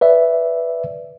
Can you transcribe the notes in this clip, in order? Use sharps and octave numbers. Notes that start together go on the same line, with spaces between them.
B4 D5 E5